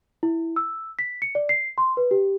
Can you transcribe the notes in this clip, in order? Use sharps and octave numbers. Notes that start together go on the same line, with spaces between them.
E4
E6
B6
C#7
D5
C7
C6
B4
G4